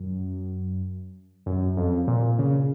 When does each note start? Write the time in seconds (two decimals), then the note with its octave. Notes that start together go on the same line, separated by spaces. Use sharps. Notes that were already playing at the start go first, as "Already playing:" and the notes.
Already playing: F#2
1.46 F#2
1.77 F2
2.07 A#2
2.39 C#3